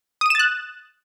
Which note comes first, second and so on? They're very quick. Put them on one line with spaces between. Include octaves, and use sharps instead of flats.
D#6 D#7 E7 A6 F#6